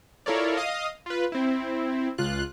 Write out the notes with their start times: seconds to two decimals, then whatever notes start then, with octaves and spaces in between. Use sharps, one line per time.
0.26 E4 F4 A4 A#4 C#5 D5
0.57 D#5 F5 D#6
1.06 F4 B4
1.32 C4 E4
2.18 C#2 F4 F#6